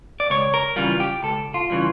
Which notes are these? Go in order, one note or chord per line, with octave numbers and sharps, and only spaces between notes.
D5
C#2 C#5
A#4
C#3 E3 G3 F4
G4
C#2 A4
F4
C#3 E3 G3